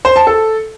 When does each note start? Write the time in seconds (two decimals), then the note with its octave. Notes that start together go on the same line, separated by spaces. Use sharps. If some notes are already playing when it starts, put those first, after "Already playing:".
0.05 C5
0.16 A5
0.27 A4